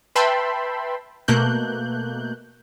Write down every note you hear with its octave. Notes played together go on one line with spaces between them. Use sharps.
B4 E5 G5 A5 B5 C6
B2 A3 A#3 F#6 G6